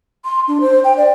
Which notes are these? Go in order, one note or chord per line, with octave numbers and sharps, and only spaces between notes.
C6
D4
C5
G5
D5